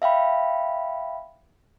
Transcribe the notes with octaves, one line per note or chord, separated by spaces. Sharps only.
E5 F5 G5 B5